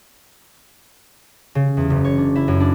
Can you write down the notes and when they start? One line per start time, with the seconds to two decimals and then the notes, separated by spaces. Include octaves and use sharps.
1.55 C#3
1.77 E2
1.90 F#1
2.04 C#5
2.18 D4
2.35 E4
2.48 F#2
2.60 D4